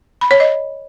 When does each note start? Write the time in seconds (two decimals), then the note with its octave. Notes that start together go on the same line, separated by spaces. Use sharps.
0.21 B5
0.31 C#5
0.40 D#5